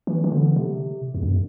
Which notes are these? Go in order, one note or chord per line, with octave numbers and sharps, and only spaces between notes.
E3
E3
D3
C3
E2
F#2